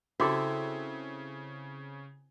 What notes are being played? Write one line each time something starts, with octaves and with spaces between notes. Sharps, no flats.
C#3 C4 E4 F#4 G4 A4 D6